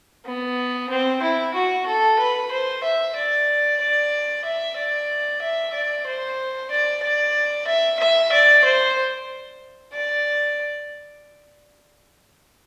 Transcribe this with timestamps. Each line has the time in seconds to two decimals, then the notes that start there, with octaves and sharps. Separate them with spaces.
0.25 B3
0.90 C4
1.22 E4
1.54 F#4
1.86 A4
2.19 B4
2.51 C5
2.83 E5
3.15 D5
3.80 D5
4.44 E5
4.77 D5
5.42 E5
5.73 D5
6.06 C5
6.71 D5
7.03 D5
7.67 E5
7.99 E5
8.32 D5
8.64 C5
9.93 D5